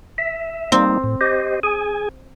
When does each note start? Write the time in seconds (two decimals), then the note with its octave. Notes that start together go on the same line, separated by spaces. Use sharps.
0.18 E5
0.72 G3 A#3 C4 D#4
1.04 A2
1.21 G4 C5 D#5
1.63 G#4 G#5